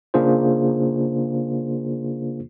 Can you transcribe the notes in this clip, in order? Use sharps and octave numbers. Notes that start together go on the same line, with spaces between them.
C#3 A#3 D4 F4 G#4 C5